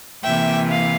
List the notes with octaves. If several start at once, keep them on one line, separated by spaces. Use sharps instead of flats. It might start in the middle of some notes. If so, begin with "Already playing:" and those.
C3 E3 A#3 E5 G5
F5